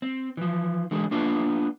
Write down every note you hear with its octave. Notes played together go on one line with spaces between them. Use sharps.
C4
E3 F3
D3 E3 G#3 G#4
A#3 B3 D4 F4 B4